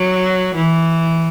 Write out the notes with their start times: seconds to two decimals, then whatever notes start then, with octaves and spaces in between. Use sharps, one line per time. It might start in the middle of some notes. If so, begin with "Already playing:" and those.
Already playing: F#3
0.55 E3